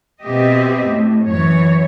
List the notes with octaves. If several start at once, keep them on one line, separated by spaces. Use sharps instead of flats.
B2 C4 G4 D#5 E5
A2
F#2 E3 C#5